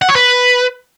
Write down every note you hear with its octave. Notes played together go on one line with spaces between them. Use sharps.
F#5
C#5
B4